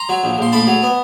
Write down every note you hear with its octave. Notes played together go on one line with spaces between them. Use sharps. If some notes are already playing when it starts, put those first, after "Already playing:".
Already playing: A#5 C6
F#3
A#1
A#1 C6
A2 A5 B5
F#3
B3